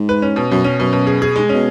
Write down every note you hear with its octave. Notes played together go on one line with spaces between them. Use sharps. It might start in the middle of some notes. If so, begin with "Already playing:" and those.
Already playing: G#2
B4
C#4
B2
F#2 B2
C#4
F#2 B2
B2
G#4
G#4
G#2 G#3
B2 C#4